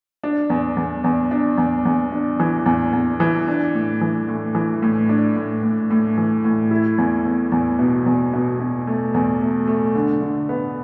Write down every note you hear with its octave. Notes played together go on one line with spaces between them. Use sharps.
D4
E2
E2
E2
D4
E2
E2
D4
E3
E2
E2
E3
D4
A2
E3
A2
E3
A2
D4
A2
A2
A2
E3
A2
E4
E2
E2
E2
B2
E2
B2
B2
A3
E2
A3
A3
D3
D3
B3